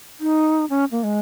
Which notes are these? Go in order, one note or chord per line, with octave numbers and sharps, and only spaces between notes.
D#4
C#4
A#3
G#3